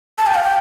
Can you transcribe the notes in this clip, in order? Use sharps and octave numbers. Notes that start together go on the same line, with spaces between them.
A5
G5
F5
G5